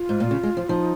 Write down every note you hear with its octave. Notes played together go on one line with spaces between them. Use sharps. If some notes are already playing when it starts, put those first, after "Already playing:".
Already playing: F4
G#2
A#2
C#3
G#3
F3
F3 D#4